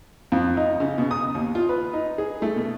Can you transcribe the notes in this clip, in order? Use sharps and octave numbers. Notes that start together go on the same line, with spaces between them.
F2
D#4
C#3
B2
D#6
D#2
F4
B4
D#4
G#4
A3
B2